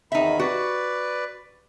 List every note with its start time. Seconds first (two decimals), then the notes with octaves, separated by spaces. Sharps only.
0.12 E2 D#3 D#4 E5 B5
0.39 F#4 B4 D5